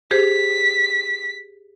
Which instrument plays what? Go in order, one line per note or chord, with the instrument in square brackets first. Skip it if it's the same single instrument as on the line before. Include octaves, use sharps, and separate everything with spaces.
[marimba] G4 G#4 C5 [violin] B6